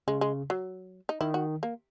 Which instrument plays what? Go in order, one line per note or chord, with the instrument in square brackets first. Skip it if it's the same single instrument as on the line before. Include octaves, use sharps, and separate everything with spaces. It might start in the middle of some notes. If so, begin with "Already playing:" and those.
[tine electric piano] C#3 [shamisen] G#3
[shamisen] G#3
F#3
D#4
[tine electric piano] D#3 [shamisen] E4
[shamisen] F#4
A#3